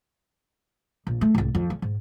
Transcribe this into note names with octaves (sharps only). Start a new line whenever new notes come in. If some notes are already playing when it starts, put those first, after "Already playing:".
A#1
A3
C2 G#2
F2
C#4
G#2